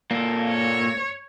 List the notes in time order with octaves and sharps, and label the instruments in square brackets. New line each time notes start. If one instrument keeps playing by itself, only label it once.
[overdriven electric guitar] A#2 A4 [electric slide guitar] A#3
[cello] C#5